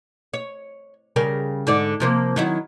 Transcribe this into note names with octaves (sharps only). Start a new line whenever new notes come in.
C#5
C#3 G3 A#4
G#2 D3 D5
C3 F3 A#3
D#3 F#3 E4